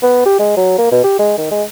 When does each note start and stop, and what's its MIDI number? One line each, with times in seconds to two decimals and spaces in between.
0.03 0.25 59
0.26 0.36 67
0.39 0.53 56
0.57 0.76 54
0.78 0.90 58
0.91 1.00 47
1.04 1.18 67
1.19 1.34 56
1.38 1.50 51
1.51 1.63 56